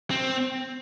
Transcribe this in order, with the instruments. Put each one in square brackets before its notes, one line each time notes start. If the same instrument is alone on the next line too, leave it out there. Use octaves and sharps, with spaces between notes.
[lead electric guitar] C4